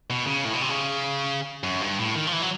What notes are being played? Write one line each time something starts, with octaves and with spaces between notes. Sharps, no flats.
B2
C#3
A2
B2
C3
C#3
F#2
G2
A2
D#3
F3
E3
F#3